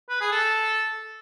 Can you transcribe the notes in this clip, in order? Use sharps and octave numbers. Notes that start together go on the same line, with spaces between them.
B4
G#4
A4